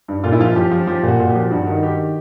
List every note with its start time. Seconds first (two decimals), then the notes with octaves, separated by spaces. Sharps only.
0.08 G2
0.24 A#2 F4
0.32 E4
0.40 F3 F4
0.56 F3 G4
0.71 F3
0.87 F3 G4
1.03 A#2
1.08 F#4
1.20 A#2
1.30 G4
1.35 F3
1.51 G2 F#4
1.67 D#3
1.83 D#3 G4